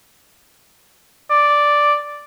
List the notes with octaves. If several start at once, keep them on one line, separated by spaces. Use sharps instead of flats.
D5